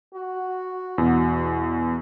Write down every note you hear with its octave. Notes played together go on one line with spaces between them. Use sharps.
F#4
E2 B2